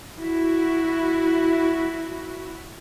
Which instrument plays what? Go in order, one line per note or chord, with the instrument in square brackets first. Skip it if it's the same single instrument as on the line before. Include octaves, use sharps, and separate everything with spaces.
[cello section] E4 F#4